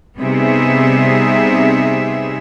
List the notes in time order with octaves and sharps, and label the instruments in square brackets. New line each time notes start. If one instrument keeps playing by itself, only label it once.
[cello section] C3 G3 B3 D#4 G#4 E5